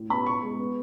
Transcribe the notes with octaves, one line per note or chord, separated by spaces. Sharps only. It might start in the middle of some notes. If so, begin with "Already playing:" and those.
Already playing: A2
B3 B5
B3 C#6
G#3
B3